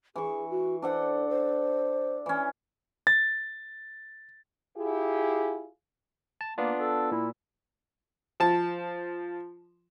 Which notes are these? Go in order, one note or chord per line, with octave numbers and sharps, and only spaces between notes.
E3 G#4 C#6
F#4
D4 A4 C5 F#5
C5
E3 C#4
A6
E4 F4 G4 G#4
A5
A#3 B3 D4 F4
A4
A#2 E4
F3 A5